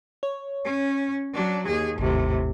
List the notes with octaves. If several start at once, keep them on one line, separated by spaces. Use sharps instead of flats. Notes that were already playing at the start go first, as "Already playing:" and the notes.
C#5
C#4
F#3 D4
D#2 G#4
G#1 D#2 A2 C3